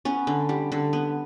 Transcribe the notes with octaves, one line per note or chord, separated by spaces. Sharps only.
B3 C#4
D3
G3
D3
B3